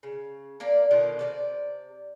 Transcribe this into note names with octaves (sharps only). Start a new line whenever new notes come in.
C#3
A#3 D4 D5
B2 D3 D#3 F4
C3 G#3 D5